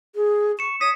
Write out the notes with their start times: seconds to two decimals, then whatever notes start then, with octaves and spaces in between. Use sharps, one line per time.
0.15 G#4
0.59 C#6 C#7 E7
0.81 C#5 D#6 B6